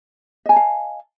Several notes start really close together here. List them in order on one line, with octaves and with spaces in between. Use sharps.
D#5 G#5 A5 F5